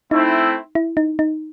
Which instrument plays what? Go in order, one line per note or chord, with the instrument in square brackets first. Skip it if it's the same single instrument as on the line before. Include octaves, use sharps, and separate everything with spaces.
[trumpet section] A3 C4 E4 [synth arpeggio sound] D#4
[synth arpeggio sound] E4
D#4
D#4